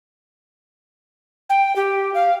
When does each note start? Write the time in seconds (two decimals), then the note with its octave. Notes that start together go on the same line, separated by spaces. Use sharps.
1.49 G5
1.76 G4
2.14 F5